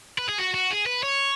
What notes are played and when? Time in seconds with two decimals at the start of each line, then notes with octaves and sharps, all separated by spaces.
0.18 B4
0.29 G#4
0.39 F#4
0.54 F#4
0.71 G#4
0.86 B4
1.03 C#5